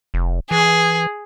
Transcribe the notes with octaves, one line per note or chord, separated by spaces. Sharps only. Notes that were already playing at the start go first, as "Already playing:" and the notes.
F1
E3 G#4